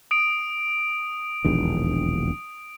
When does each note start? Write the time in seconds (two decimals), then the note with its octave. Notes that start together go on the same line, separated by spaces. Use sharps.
0.11 D#6 D7
1.45 E1 A#1 D#2